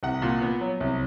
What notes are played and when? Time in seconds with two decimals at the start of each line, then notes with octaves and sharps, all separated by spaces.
0.03 C2 F#5
0.22 A#2
0.42 B3
0.61 F#3
0.80 C2